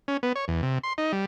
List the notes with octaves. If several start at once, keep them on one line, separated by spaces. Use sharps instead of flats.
C#4
B3
C#5
E2
C3
C6
D#4
G3